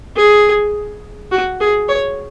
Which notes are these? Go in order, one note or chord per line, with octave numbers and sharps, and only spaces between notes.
G#4
F#4
G#4
C#5